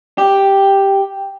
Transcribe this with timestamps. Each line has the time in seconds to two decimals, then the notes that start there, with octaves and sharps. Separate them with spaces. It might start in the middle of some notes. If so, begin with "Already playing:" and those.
0.18 G4